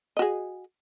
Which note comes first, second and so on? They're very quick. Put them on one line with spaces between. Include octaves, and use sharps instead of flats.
D#5 F#4 G#4